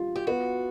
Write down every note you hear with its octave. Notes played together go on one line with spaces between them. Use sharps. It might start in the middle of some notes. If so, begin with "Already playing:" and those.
Already playing: G3 F4
G4
B3 F#4